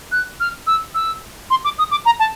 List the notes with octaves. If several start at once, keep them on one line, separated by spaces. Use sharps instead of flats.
F#6
F6
E6
E6
C6
D6
D#6
D6
A#5
A5